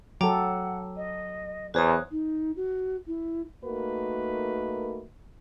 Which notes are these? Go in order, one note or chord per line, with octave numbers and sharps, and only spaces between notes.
F#3 A4 F#5 G5 A#5 D6
D#5
E2 C5 C#5 D#6 F#6
D#4
F#4
E4
A3 A#3 D#4 F#4 A#4 B4